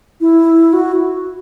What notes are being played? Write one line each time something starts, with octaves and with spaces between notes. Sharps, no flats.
E4
F#4